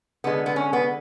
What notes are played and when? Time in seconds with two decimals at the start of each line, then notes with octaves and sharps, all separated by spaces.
0.24 D3 G#3 B3
0.46 B3
0.56 C#4
0.73 B3